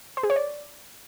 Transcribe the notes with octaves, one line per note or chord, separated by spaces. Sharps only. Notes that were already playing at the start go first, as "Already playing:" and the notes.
C5
G#4
C#5
D5